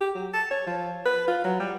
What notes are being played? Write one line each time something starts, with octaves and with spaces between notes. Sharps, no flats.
G4
F#3
A5
C#5
F3
B4
F4
F#3
G3